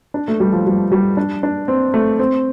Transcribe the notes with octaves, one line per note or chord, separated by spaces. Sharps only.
D4
A3
G3
F3
G3
G3
D4
D4
C4
A3
C4